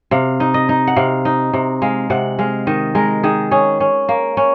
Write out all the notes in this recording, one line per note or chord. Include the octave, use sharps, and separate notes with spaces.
C3 F5
D#4
D#5
D#4
F#5
C3 F5
D#4
C3
G#3 F5
C3 F#5
G#3 F5
D#3 D#5
G#3 A#4
D#3 G#4
C#4 G#4
C#4
A#3
C#4